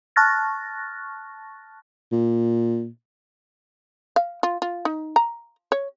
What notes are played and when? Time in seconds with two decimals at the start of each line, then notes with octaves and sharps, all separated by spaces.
0.16 A5 C#6 F6 F#6 A6 A#6
2.12 A#2
4.16 F5
4.43 F4
4.62 F4
4.85 D#4
5.16 A#5
5.72 C#5